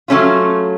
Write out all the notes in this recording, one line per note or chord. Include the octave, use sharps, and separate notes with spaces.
F#3 A3 C#4 F4